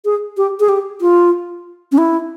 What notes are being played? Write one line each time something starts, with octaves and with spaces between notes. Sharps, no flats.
G#4
G4
G#4
G4
F4
C#4
E4